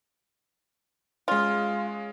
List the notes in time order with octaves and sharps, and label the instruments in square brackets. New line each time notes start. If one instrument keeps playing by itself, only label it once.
[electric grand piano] G#3 C#4 [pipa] F4